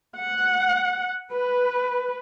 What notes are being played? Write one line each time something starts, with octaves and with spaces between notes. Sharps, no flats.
F#5
B4